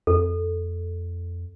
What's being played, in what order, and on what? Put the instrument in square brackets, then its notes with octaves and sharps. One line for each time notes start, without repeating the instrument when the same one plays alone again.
[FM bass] F2 [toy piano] A4